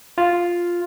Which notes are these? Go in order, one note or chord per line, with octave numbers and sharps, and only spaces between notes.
F4